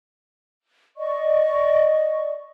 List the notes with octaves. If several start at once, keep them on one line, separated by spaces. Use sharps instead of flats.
D5 D#5 C#6